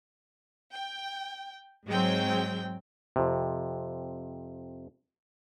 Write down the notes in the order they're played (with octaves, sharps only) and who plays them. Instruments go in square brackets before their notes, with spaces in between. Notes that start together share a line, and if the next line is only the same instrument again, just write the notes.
[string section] G5
G#2 F#3 G#3 C4 G5
[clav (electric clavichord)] F2 C3